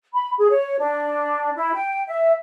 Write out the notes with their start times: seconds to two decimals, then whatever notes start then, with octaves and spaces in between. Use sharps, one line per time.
0.13 B5
0.38 G#4
0.50 C#5
0.78 D4
1.55 E4
1.74 G5
2.07 E5